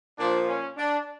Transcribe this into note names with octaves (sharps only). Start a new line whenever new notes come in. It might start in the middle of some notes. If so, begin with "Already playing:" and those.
A#2 F3 D4
C#4
D4